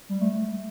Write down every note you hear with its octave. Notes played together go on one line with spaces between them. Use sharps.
G3
A3